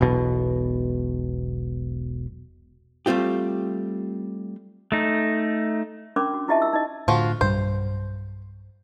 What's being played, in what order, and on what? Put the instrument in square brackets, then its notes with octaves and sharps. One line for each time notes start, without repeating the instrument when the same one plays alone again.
[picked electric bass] E1 B1 B2
[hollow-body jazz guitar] G3 A3 C4 F4 G4
[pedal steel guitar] A3 D#4
[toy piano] C#4 D4 A#4 B5 C6 D6
F#4
E4 F4 G4 D#5 E5 A5
E6
D#4 D#5
[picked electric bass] A2 D3 [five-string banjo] F3 F4 F#4
[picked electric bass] B1 G2 G3 [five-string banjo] C5